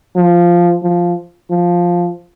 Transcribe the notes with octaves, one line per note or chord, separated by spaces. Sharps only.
F3
F3
F3